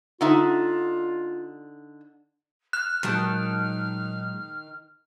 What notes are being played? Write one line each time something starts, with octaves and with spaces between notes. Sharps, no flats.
D3 D#4 F4 E5
F6 F#6
A#2 D#3 F#3 G#3 A5